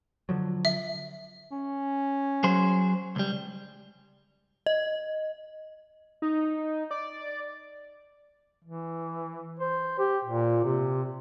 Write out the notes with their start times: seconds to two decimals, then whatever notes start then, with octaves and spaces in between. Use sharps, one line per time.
0.29 D3 F3 F#3
0.65 E5
1.52 C#4
2.44 F#3 G#4 C5
3.16 C#2 G3
4.66 D#5
6.22 D#4
6.91 D5
8.65 E3
9.59 C5
9.99 G4
10.25 A#2
10.64 C3